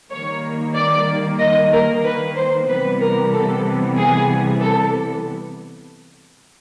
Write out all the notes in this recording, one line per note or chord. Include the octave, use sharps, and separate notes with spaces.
D#3 G3 A#3 C#5
D5
D#5
A#4
B4
C5
C3 E3 G3 B3 B4
A#4
A4
G#4
A4